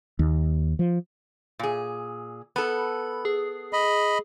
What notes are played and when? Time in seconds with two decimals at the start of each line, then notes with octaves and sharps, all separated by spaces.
0.19 D#2
0.79 F3
1.59 A#2 G#4
2.56 B3 A4 B5
3.25 G#4
3.73 D#5 B5